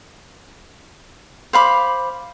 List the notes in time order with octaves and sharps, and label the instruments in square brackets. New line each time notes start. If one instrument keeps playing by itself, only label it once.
[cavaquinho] C5 F5 B5 D6